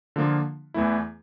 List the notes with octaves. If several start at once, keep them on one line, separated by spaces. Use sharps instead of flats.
D3 F3 A#3 F4
E2 E3 A3 E4